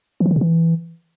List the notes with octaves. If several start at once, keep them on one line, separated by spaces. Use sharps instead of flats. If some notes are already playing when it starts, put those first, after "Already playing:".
E3
F3
D#3
C3
E3